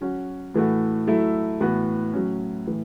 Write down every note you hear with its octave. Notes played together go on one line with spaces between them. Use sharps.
F#3 C#4 F#4
A2 E3 A3 F#4
F#3 A3 E4
A2 E3 B3 F#4
A2 F#3 C#4
A2 E3